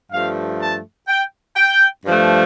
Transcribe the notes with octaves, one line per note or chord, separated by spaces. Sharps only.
G2 F3 A3 F5
A5
G5
G5
G2 F3 A3